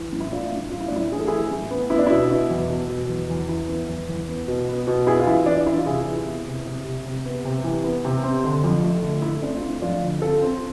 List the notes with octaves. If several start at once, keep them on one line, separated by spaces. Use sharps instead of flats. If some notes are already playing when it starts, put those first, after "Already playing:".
Already playing: E3
A2
E4
A2 D4 F4
A2
A2 F4
E4
D4
A2 E4
E3 G#4
A4
E3 E4 G#4
A2
B3
B3 E4
D4
B2 E4
B2
E2
B2
B2
E2
E2
E2 E4
B3
E2
E2
B3
B2
B3
B2
B3 E4 G#4
F4
E3 E4
E3 D4
E3 E4
F4
C3 E4 G#4
E3
B3
C3
C3
C3
C3
B3
C3
E3
B3
C3
C4
D3
F2
A3
D3
A3 E4
C4 D4
F4
A3 E4
F2 D4 F4
D3
C4 F4 A4
C4